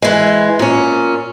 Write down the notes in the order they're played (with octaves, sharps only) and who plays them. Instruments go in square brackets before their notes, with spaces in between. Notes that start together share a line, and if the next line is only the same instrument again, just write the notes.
[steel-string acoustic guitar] E3 G#3
A#2 C#4